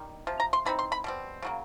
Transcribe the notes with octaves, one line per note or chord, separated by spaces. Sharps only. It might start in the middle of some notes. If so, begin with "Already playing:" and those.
Already playing: D#3 G3
C3 F3
A#5
C6
E3 G#3 C4 D#4 B5
C6
B5
B2 G3 C4
C#3 F#3 A#3